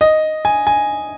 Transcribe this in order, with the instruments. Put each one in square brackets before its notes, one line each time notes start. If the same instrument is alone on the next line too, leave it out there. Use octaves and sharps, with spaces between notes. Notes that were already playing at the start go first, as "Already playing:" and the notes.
[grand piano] D#5
G#5
G#5